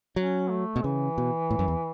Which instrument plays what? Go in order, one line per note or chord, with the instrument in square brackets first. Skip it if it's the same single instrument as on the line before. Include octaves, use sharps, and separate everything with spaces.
[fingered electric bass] F#3 [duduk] C#4
[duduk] A3
[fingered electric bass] B2
[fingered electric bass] C#3 [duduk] E3
[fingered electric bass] B2
A2
F#2
E2